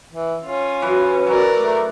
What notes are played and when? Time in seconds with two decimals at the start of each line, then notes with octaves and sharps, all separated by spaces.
0.13 E3
0.44 C#4 F4
0.82 F#2 E3 B4
1.26 F#3 A#4 D5
1.57 A3